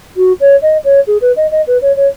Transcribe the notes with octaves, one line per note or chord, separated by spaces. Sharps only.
F#4
C#5
D#5
C#5
G#4
B4
D#5
D#5
B4
C#5
C#5